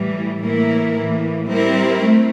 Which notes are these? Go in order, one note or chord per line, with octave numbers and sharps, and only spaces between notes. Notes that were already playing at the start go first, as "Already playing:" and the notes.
Already playing: A2 E3 G3
A2 E3 A#3 E4 A#4
A2 E3 A#3
G3 C4 E4 A#4
A3